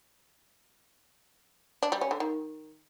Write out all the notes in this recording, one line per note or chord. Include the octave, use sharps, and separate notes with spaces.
D4
G3
C#4
D3
D#3